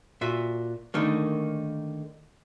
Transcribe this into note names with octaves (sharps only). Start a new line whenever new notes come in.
A#2 F4 F#4 E5
D3 D#3 A3 A#3